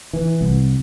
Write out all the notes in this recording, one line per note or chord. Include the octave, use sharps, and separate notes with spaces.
E3
C2